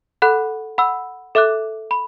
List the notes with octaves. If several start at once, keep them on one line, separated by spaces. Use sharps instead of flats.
A4 F#5 B5 F#6
F#5 B5 E6
A4 E5 D6 F#6
B5